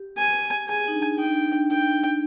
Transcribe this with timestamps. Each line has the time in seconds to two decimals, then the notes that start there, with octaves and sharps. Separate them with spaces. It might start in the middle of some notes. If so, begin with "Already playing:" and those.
Already playing: G4
0.17 G#5
0.68 G#4 G#5
0.88 D#4
0.94 D4
1.19 D#4 G5
1.29 D4
1.51 D4
1.70 G5